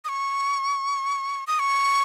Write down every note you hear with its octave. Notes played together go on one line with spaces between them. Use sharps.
D#6
C#6
D#6
C#6